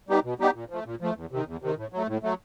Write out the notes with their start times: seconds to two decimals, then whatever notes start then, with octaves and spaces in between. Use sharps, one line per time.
0.09 G3 B3 D#4 G4
0.24 B2
0.39 G3 B3 D#4 G4
0.54 A#2
0.70 F3 A3
0.85 A#2
1.01 F3 A3
1.16 E2
1.31 C3 D#3
1.47 E2
1.62 C3 D#3
1.77 A2
1.93 F#3 A3
2.08 A2
2.23 F#3 A3